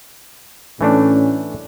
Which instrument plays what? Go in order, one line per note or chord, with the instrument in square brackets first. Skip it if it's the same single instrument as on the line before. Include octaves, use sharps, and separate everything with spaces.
[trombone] A2 [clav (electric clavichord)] E3 A3 D4 [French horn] C#4